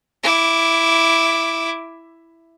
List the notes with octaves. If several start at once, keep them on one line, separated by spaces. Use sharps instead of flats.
E4 D6